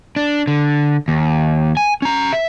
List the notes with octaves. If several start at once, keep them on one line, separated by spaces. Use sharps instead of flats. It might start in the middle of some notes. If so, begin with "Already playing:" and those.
D4
D3
D#2
G#5
C#4 A#5
E5